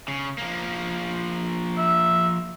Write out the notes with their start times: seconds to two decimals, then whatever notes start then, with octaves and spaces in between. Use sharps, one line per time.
0.08 C#3
0.38 F3 A#3
1.78 E5